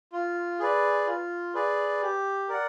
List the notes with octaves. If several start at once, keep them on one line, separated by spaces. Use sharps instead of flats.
F4
G#4 B4 D5
F4
G#4 B4 D5
G4
A#4 D5 F#5